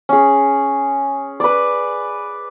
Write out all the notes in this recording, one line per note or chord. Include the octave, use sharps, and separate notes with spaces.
C#4 G#4
B4 D5